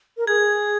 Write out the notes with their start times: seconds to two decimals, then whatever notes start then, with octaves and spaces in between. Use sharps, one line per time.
0.17 A#4
0.27 G#4 G#6